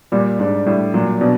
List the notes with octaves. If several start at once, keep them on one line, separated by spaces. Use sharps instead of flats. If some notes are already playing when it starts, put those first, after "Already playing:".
A#2 G3
G#2 D4
A2 G3
A#2 F#3
B2 D4